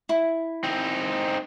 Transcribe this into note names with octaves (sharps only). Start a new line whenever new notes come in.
E4
C4 D#4